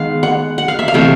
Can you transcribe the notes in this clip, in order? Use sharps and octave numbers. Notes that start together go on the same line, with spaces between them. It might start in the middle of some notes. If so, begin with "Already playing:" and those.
Already playing: D#3 G#3 B3 F5
F#5
F#5
F5
E5
F5
C3 E3 A3